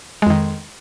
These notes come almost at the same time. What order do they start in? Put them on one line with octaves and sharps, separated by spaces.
G#3 F2 D#3